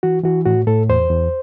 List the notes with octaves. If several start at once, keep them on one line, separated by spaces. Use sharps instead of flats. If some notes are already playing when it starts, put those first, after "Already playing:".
E3 F#4
E3 F#4
A2 F#4
A2 A4
E2 C5
E2